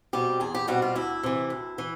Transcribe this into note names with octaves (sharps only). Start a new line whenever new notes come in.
B2 G3 C4 G4
E2 G#4
G4
B2 G3 C4 F#4
F4
D2 E4
C3 E3
D2
E3